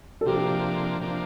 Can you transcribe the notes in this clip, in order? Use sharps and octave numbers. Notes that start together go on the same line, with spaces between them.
A4
C3 F3 A#3 D4 G4
C3 F3 A#3 D4